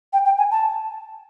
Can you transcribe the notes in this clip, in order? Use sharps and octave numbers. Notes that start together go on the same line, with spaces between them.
G5
G5
G#5
A5